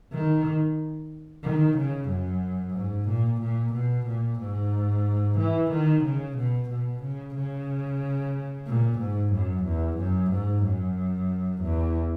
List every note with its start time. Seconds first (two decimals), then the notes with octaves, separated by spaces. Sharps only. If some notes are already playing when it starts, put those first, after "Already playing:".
0.13 D#3
1.44 D#3
1.77 C#3
2.09 F#2
2.75 G#2
3.08 A#2
3.41 A#2
3.73 B2
4.07 A#2
4.40 G#2
5.38 E3
5.71 D#3
6.04 C#3
6.37 B2
6.69 B2
7.03 C#3
7.35 C#3
8.67 A#2
8.99 G#2
9.33 F#2
9.65 E2
9.98 F#2
10.32 G#2
10.63 F#2
11.63 E2